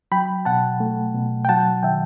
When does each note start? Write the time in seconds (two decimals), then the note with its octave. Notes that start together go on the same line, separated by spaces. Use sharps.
0.12 F#3 G5 B5
0.45 B2 F#5 A5
0.80 A3
1.15 B2
1.45 G5
1.49 F#3 F#5 A5
1.83 D#3 E5 G5